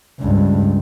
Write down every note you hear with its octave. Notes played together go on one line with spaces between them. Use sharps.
C#2 G2